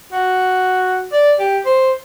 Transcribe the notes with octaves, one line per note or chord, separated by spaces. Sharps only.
F#4
D5
G4
C5